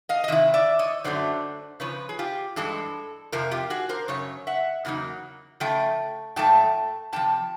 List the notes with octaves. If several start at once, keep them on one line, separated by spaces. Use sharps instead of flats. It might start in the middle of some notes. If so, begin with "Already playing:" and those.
D#5 F5
D#5
C3 D#3 E4 E5
D5 E5
C#5 D#5
F#2 D3 F#3 A3 C5 D5
C#3 F3 B4 C#5
G#4
F4 G4
G2 E3 G#3 A4
F2 C3 F3 A#4
F4 G4
F#4 G#4
A#4 C5
F#2 C#3 C#5
E5 F#5
E2 C#3 F#3 A#3 D#4
C#3 F3 A3 G5
G#2 F3 A3 G5 A5
F2 C3 F3 G5 A5